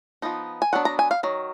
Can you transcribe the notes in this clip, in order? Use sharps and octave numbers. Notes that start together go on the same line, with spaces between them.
F3 B3 D#4
G#5
F#3 B3 D4 F#5
A#5
G#5
F5
D#3 F#3